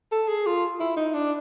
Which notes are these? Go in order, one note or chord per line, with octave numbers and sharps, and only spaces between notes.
A4
G#4
F4
E4
D#4
D4